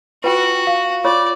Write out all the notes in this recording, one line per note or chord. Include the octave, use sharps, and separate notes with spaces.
F4 F#4 B4 G5
F5
F4 C#5 D5 C#6